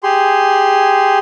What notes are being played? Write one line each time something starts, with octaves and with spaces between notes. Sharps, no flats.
G4 G#4 C6